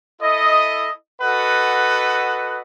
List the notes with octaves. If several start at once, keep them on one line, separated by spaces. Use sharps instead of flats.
E4 A4 D#5
F#4 A4 B4 D#5 F#5